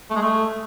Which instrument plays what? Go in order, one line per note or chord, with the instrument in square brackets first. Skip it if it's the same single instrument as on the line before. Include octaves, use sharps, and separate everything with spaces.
[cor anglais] A3
G#3
A3